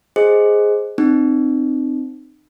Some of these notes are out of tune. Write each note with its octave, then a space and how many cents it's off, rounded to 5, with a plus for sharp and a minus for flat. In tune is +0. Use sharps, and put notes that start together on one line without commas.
G#4 +0 C5 +0 D#5 +0
C4 +0 D#4 -35